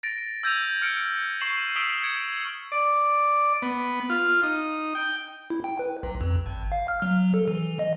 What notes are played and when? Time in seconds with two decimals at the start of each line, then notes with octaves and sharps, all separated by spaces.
0.03 A6 A#6 D7
0.43 E6 G6 G#6 A#6 D#7 F7
0.82 F6 C#7 D7
1.41 C#6 C7 E7 F#7
1.76 D#6 E6 B6 D7 E7 G7
2.02 G#6 C#7 D7 E7
2.72 D5
3.62 B3
4.10 F4
4.43 D#4
4.95 G5
5.50 E4
5.64 G5
5.79 B4
6.03 B1
6.21 F2
6.46 G#1
6.72 F5
6.88 F6
7.02 F#3
7.34 A4
7.48 E3
7.79 D#5